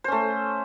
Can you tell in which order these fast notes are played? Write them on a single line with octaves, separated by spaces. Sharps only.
C5 C#4 A3